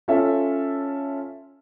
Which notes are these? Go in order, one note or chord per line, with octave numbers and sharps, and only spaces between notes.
C#4 F4 A4 E5